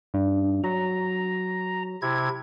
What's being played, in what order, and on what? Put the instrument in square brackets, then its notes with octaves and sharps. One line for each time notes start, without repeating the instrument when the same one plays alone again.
[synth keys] G2
[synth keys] F#3 [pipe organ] A#5
[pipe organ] C3 E4 G#6